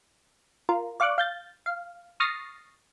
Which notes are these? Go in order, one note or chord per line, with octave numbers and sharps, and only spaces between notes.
F4 A#4
D5 F5 C#6 D6 F#6
F5 G6 A6
F5
C#6 D#6 F6 A6 A#6 C7